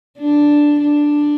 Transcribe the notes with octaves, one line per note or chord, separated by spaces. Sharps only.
D4
D4